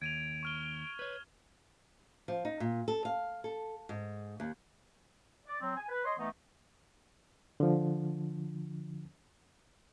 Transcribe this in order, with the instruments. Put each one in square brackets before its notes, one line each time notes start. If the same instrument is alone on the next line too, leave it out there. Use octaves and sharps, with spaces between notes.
[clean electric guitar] D#2 [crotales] G#6 D#7 F7 [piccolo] D7
[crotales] C#6 F6 G7
[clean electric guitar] B4 C#5
[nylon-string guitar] F3
D#4
A#2
A4
F5
A4
G#2
D#2
[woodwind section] D5
F#3 C4
G#5
B4
C#5 D#5 C6
E3 A3 B3 D#4
[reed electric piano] D3 F3